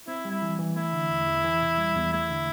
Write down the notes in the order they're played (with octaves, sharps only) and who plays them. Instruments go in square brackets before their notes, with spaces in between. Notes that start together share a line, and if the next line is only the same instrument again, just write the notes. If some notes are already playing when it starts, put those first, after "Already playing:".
[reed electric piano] C4 [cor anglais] E4
[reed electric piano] G3
[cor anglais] E4
[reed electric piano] E3
E3
[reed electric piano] A3 [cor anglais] E4
[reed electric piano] D3
E2
E2
E3
C3
G3
E2
[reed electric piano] A3 [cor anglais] E4
[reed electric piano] D3